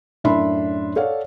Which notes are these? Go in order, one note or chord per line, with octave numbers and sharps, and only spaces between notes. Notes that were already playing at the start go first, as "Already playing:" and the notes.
F#2 A2 D4 E5 B5 C6
A4 C#5 D5 F5 F#5